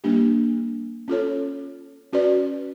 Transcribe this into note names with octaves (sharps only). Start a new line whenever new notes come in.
G3 A#3 D4 G4
C#4 F4 A4 C#5
C#4 F#4 B4 D5